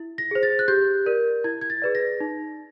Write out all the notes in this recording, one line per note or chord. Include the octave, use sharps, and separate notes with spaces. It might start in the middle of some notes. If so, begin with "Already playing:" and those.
Already playing: E4
A#6
G#4 C5
A6
F#6
G4 G6
A#4 D5
E4 G#6
G#6
A6
G#4 B4 D5
A#6
D#4